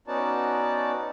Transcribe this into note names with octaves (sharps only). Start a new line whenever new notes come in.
B3 C#4 D#4 F#4 D5 A5